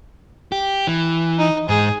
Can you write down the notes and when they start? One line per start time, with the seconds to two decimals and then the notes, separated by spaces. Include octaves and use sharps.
0.52 G4
0.87 E3
1.38 D#4
1.69 G#2 G#4